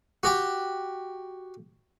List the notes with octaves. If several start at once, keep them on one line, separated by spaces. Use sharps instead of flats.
F#4 G4 G5